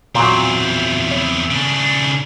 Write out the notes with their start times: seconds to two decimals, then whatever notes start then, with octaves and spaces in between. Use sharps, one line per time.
0.15 E2 A#2 F#3 C4
1.11 C#5
1.51 C#3 D4